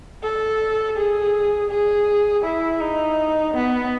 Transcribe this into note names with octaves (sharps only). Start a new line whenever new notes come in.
A4
G#4
G#4
E4
D#4
B3